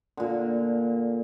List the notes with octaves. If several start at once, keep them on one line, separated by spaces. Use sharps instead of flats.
A#2 D3